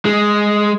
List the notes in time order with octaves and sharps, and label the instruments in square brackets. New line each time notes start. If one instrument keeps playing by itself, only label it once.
[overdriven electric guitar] G#3